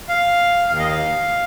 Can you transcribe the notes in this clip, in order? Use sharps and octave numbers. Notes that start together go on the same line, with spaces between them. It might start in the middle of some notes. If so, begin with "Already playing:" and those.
F5
D#2 D#3 F5
D#5
F5